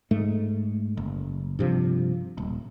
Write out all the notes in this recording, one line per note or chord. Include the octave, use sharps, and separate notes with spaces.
G#2 A3
F#1
G2 C3 F3
D#1